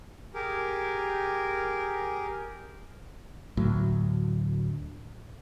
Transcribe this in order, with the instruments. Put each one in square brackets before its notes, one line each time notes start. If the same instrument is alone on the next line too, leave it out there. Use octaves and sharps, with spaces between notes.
[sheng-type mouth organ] G4 G#4 A#4
[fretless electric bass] D2 A2 F#3